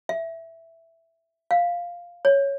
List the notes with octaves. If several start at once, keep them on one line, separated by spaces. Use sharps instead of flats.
E5
F5
C#5